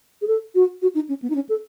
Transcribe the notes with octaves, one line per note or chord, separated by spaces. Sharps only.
G#4
A4
F#4
F#4
D#4
C#4
B3
D#4
C#4
A4